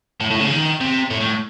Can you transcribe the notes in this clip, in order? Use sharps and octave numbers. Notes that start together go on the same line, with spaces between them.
A2
A2
C#3
D#3
C3
A2
A2